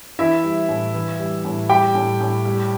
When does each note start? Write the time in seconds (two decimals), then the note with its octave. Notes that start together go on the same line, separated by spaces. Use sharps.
0.19 E3 E4 E5
0.44 G3
0.69 A2
0.94 E3
1.19 G3
1.45 A2
1.69 G3 G4 G5
1.95 A2
2.20 A2
2.45 G3